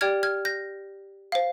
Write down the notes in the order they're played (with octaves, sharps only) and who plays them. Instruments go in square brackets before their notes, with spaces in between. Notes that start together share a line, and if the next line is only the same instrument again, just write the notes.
[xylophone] G4 D5 G5 F6 G#6
F6 G#6
G6 A#6
C5 F5